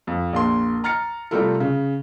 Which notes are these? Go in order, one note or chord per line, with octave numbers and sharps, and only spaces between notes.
F2
A#1 A#3 C6
A#5 F6 A6 C#7
C3 G3 A3 F4 A4 A#4
C#3